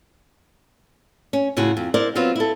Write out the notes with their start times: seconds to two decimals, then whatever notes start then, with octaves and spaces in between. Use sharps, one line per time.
1.33 C#4
1.57 A2 C#3 F4 F#4
1.77 F2
1.94 E4 A#4 C5 D5
2.15 F#3 B3 C4 F4
2.36 E4 A4